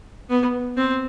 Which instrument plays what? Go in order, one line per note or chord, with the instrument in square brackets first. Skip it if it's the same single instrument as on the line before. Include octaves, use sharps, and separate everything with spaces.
[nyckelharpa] B3
C4